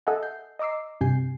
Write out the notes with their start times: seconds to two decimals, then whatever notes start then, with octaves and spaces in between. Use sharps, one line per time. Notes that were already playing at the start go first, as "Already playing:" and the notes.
0.07 A4 D#5 E5 F#5 G#5
0.23 G6 C7
0.59 D#5 A#5 D6 E6 C7
1.01 G2 C3 G#5 G6 C7